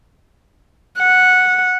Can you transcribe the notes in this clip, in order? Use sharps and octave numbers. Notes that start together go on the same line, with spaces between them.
F#5